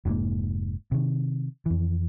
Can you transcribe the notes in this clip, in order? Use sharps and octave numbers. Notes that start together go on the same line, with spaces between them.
F1 G#2 B2 A#3
C3 D#3
F2 E3